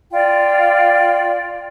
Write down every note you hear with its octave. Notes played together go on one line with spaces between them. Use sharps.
F4 D5 G5